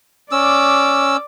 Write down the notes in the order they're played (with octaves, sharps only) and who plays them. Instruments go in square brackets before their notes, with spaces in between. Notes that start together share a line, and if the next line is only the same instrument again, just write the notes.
[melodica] C#4 E6 [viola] D5 D6